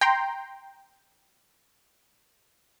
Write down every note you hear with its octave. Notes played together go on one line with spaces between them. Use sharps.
G5 A#5 C6